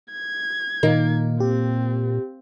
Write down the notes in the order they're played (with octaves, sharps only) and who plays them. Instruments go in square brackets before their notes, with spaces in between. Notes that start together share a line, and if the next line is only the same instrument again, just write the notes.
[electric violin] G#6
[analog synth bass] A#2 [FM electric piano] D#3 D#4 [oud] A#3
[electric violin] C4 [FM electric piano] G4